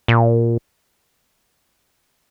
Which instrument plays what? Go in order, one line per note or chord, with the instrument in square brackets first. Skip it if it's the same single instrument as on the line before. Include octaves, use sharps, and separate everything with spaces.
[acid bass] A#2